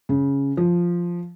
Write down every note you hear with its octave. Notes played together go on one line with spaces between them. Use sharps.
C#3
F3